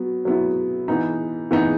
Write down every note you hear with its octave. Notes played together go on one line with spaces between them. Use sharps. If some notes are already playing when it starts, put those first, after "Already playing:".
Already playing: F#3 B3
F#3 B3 E4
E3 B3 D#4
E3 B3 D#4